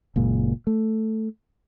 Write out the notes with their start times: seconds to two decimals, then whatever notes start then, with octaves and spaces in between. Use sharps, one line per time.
0.16 F#1 A#2 G#3
0.67 A3